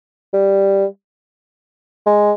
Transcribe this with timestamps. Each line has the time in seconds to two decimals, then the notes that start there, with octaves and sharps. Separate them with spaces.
0.34 G3
2.06 G#3